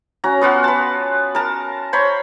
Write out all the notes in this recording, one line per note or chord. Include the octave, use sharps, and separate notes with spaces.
C#4 F#4 A#5
B3 F4 F#4
B4 A5
A#4 A5
C5 C#5 A#5 B5